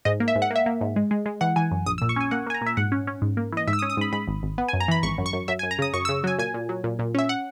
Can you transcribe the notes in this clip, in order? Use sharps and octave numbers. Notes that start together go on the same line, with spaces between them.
G#2 D#5
A#3
E5
G#2
F#5
A#3 E5
A#3
G#2
G#3
G#3
G#3
E3 F#5
E3 G#5
F#2
A#1 D#6
E6
A#2
C#6
C#4 G#5
A#3 F#5
A#3 G#5
A#5
A#2 E5
G#2 F#5
C#4
C#4
G#2
A#3
E3 D#5
G#2 E5
E6
D#6
C#4
D#6
G#2 B5
G#2 B5
G#1
G#1
B3
F#2 G#5
A#5
E3 B5
G#1 C#6
F#2
C#6
F#2
F#2 E5
G#5
F#2
A#5
C#3 D#6
F#2 C#6
E6
C#3
F#3 G#5
A#2 G#5
A#2
F#3
A#2
A#2
C#4 E5
F#5